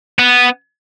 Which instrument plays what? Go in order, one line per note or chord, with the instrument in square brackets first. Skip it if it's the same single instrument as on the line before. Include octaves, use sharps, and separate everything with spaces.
[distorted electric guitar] B3